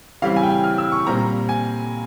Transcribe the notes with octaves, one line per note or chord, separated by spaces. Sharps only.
C#3 E3 G3 C4 F5
G#5
G5
G#5
F6
E6
C#6
A#2 G3 C4 A#5
G#5